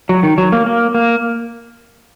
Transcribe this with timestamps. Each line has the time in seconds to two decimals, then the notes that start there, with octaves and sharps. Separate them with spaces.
0.09 F#3
0.23 D#3
0.38 F#3
0.52 A#3
0.66 A#3
0.94 A#3